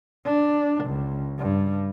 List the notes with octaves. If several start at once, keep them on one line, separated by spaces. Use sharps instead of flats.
D4
C#2
G2